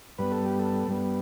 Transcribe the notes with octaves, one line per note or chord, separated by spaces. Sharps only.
G2 G3 B3 B4
A4
G4
A4
G2 G3 B3